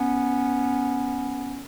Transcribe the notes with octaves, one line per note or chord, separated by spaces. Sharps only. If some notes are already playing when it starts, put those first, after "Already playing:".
Already playing: B3 C#4